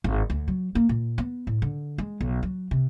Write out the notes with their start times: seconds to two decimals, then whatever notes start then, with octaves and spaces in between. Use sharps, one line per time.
0.04 G#1
0.30 D2
0.48 F#3
0.75 A#3
0.89 A#2
1.18 B3
1.47 A2
1.62 D3
1.98 G#3
2.21 B1
2.43 F#3
2.71 C3